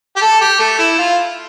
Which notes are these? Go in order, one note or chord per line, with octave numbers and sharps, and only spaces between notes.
G4
A4
G4
A3
E4
F4